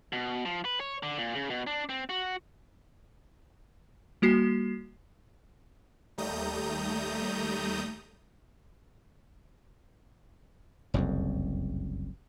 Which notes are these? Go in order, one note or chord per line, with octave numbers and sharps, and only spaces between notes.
B2
F3
B4
C#5
D3
A#2
C#3
B2
D4
C4
F#4
G3 A#3 F#4 C7
D#2 G3 A3 A#5 D#6 G6
F#1 C2 F2